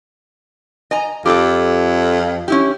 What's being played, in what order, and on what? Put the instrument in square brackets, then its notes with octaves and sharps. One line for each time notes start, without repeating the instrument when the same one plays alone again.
[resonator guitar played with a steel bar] D#5 G#5 A#5
[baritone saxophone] F2 [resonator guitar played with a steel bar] G4 A4
[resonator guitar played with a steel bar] C#4 E4 G4